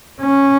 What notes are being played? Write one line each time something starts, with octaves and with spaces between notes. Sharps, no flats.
C#4